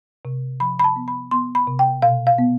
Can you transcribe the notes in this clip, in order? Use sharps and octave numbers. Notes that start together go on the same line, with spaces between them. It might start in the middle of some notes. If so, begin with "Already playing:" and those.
C3
F3 B5
B5
A5
B3
B5
B3 C6
B5
C3
G5
B2 F5
F5
B3